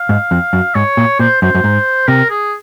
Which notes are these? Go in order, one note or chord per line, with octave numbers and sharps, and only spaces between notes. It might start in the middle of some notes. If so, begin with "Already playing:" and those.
Already playing: F5
G#2
F2
F#2
G#2 C#5
A#2
A#2 C5
F#2 C5
F#2
G#2
C3 A#4
G#4